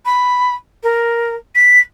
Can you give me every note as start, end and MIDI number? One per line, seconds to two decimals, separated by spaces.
0.05 0.54 83
0.83 1.35 70
1.55 1.80 95